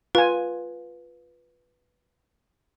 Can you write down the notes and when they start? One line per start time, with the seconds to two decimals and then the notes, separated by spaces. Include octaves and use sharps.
0.15 F4 B4 G#5